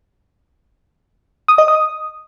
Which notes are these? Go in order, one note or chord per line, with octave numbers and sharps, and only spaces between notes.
D#6
D#5
D#6